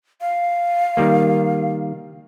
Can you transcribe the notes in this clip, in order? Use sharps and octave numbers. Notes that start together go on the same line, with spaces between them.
F5
D#3 G3 A#3